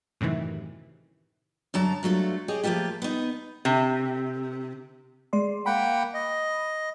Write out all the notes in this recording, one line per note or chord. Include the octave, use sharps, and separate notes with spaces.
F#2 A2 C3 D#3 E3
F#2 D3 F#3 A5 A#5
G2 F#3 A3 F4
G4 G#4 C#5 D#5
F3 A3 A#3 F4 G4
B3 D#4
C3
G#3 D5 C6
A#3 F#5 G5 B5
D#5